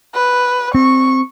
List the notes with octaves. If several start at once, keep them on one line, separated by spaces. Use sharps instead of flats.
B4
C4 C#6